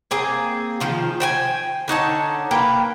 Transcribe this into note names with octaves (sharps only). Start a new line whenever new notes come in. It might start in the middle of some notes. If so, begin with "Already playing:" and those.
A#3 C4 G#4
D#3 F3 F4
C5 G5 G#5
D3 D#4 C#5 A5
A#3 A#4 B4 G5